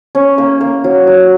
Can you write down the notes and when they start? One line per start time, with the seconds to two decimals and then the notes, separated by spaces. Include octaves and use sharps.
0.15 C#4
0.38 A#3
0.61 A#3
0.84 F#3
1.07 F#3